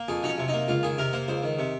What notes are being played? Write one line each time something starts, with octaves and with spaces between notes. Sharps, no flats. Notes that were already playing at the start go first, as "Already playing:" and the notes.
Already playing: A#3
F2 G#4
F#3 D#4
C#4
C3
A#3 D#4
C#2 F4
D#3 G#4
C3 A#4
A#3 C5
C#2 C5
D#3
C3